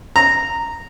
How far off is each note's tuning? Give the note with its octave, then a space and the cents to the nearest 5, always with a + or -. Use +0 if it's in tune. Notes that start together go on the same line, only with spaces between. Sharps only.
A#5 -10